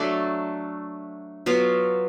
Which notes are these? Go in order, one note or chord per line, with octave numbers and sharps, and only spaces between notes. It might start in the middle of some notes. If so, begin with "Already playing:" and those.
Already playing: F#3 A3 D4
F#3 B3 F4